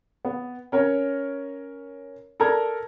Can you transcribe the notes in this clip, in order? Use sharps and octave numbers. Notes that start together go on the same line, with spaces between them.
B3
C#4 A#4 C#5
A4 A#4 D5 A#5 G#6